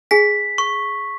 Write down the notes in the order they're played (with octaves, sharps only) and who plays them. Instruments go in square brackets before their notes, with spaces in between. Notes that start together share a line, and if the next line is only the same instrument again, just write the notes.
[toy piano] G#4 G#5 [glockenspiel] B6
[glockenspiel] C#6